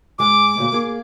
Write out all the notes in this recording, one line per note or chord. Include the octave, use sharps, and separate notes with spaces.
G#2 G#3 D6
D2 A#2
A#3 G#4